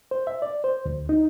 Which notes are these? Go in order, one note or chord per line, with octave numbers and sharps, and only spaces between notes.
C5
E5
D5
C5
D2
D#4